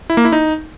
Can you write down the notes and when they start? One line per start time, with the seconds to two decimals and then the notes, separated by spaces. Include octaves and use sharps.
0.10 E4
0.17 A#3
0.25 E4
0.32 D#4